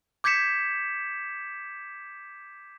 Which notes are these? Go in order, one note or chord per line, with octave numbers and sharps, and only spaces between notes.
D6 G6 G#6 B6 C#7 E7